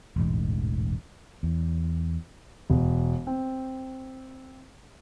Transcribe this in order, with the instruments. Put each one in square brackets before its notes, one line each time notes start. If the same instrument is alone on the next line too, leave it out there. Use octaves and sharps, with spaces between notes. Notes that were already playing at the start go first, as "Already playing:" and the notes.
[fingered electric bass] E1 A1 G#2
E2
[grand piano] E1
C4